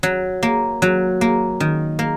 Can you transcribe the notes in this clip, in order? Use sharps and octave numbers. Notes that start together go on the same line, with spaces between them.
F#3
A#3
F#3
A#3
D#3
A#3